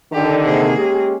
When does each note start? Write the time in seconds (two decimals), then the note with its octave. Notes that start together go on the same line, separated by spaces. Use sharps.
0.13 D3 D#3 G4
0.43 C3 A#3 G#4
0.77 G#3 C#4 G4